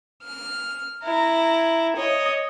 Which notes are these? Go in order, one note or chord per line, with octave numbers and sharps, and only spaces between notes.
F6
E4 A#5
C#5 D#5